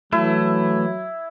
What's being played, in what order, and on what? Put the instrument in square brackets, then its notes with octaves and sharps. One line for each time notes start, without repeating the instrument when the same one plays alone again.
[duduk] E3 [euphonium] F#3 [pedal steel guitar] A3 [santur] E4